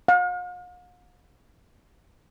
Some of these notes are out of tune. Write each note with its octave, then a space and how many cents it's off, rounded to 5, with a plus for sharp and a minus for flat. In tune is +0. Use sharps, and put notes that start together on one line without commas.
F5 +45